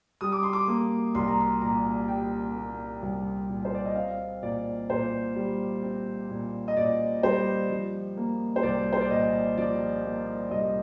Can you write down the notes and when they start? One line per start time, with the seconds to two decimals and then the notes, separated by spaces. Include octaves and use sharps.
0.21 G3 D#6
0.32 D6
0.43 C6
0.53 D6
0.68 A#3
1.15 C2 C6
1.28 A#5
1.41 C6
1.62 A#2 A#5
2.08 G3 G5
2.55 A#3
3.03 C2
3.49 A#2
3.65 C5
3.75 D5
3.86 D#5
3.95 C4 F5
4.43 A#2 D5
4.90 A#2 C5
5.36 G3
5.83 C4
6.30 A#2
6.68 D#5
6.76 A#2 D5
7.23 G3 C5
7.70 F3
8.17 A#3
8.56 C5
8.63 C2 D5
8.93 C5
9.01 D5
9.10 A#2 D#5
9.57 F3 D5
10.04 A#3
10.50 C2 D#5